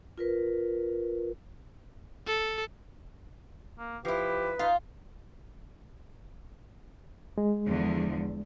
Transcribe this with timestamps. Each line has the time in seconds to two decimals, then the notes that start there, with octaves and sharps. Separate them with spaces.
0.18 F4 A#4 B4
2.27 A4
3.79 A#3
4.05 F3 E4 G4 B4
4.59 D#4 F4 F5
7.38 G#3
7.67 E2 D3 F3